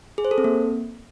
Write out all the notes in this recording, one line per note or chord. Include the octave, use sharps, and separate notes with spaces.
G#4
C5
A4
C4
A#3